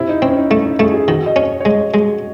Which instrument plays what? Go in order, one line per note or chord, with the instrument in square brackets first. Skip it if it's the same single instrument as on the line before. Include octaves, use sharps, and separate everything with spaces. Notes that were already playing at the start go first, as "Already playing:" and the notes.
Already playing: [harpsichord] C3 [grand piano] E4
[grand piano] D#4
[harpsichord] C4 [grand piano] C#4
[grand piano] D#4
[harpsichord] A3
[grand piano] D#4
[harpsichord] A3 [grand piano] G#4
[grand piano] G#4
[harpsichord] D#3 [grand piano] F#4
[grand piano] D#5
[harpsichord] C#4 [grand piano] C#5
[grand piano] C#5
[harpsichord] G#3 [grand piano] D#5
[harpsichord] G#3